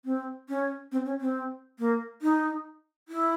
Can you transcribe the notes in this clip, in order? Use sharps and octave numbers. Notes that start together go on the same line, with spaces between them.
C4
C#4
C4
C#4
C4
A#3
D#4
E4